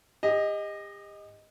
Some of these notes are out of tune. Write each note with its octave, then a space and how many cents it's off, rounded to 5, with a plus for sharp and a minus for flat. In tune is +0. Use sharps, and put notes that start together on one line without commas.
G4 +40 D#5 +0